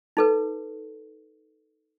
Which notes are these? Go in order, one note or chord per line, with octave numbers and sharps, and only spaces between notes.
D#4 A4 B4